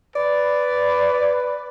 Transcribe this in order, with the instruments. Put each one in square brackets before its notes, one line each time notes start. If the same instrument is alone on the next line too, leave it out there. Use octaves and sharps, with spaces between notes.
[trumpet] B4 [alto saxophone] D5